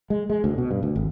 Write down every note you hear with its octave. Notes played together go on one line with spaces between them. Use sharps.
G#3
G#3
D2
B2
G2
D2
G#1